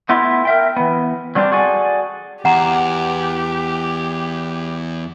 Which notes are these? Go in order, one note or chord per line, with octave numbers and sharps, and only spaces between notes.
A3 B3 E4 F4
A#4 E5 G5
E3 B3
F#3 G3 C4 D4 F4 G4
F#4 G#4 A4 D5 G#5
E2 G4 F#5 A#5